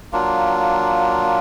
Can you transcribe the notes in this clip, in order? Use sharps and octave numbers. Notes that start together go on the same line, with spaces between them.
F#3 A#3 D4 F4